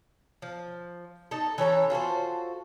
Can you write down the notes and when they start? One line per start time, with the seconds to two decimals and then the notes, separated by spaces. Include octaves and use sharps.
0.42 F3
1.31 D#4 A4
1.58 E3 C#4 A4 A#5
1.90 F4 F#4 A4 C5